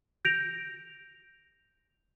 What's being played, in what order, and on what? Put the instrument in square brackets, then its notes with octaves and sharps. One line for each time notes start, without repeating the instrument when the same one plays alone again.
[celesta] G6 A#6 D7 F7